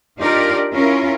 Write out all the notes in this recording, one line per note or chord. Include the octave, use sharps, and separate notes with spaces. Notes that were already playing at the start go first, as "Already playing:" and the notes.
D4 D#4 F4 G4 A#4 D5
C#4 E4 F4 A#4